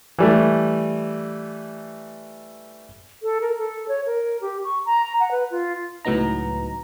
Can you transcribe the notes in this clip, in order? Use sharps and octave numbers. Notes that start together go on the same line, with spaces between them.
E3 G3 A3
A4
A#4
A4
C#5
A#4
G4
C#6
A#5
F#5
B4
F4
C#2 A2 F#3 B3 D#4 A#5